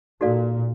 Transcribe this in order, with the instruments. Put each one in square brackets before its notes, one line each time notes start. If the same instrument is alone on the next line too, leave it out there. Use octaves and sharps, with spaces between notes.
[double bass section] A#2 [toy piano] D#4 F#4 A4 D5 F5